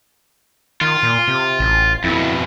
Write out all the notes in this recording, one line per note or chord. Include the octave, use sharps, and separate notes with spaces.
D#3 F4
A#2
C3
A1
F2 B2 E4